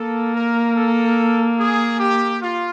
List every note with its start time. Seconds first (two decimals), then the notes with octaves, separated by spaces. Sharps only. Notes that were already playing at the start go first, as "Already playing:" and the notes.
Already playing: A#3 A4
0.34 A#4
0.75 A4
1.58 G#4
1.99 G4
2.41 F4